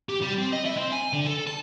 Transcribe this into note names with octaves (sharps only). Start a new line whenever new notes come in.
G4
G3
C4
D#5
E4
C4
G#5
D3
A4
A5